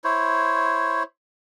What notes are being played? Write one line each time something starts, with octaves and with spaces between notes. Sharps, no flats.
E4 C5 C#5